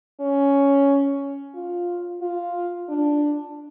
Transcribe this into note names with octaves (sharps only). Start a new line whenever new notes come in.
C#4
F4
F4
D4